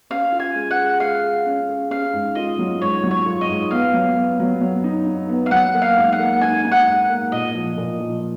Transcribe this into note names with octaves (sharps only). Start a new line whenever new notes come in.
C#4 F5
F4
G#5
G#3
F#5
G#4
G#3 F5
G#4
C#4
G#4
C#4 F5
G#2
F4 D#5
F#3
G#2 C#5
F#3
C#5
F4
D#5
G#2
B3 F5
F#3
B3
F#3
F#3
D#4
D#4
B3
F5
F#3 F#5
A#3
F5
G#2
F#5
A#3
D#4 G#5
D#4
F#5
G#2
A#3
A#2 D#5
F3
A#2
F3